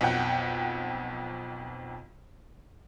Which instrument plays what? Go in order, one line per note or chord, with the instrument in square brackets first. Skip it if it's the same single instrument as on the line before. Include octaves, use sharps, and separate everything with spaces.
[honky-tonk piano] B1 F2 F#5 G5